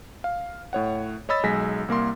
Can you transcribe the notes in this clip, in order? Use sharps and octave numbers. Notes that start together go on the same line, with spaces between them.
F5
A2 C#5 F#5
C#5 D#5 B5 E6 A6
B1 G#3 G#5 A#6 B6
C2 A#3 A#4 C6